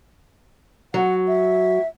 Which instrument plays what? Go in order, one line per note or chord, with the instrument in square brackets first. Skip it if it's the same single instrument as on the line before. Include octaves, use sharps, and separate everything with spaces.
[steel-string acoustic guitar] F#3 [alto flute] F#5
[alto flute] E5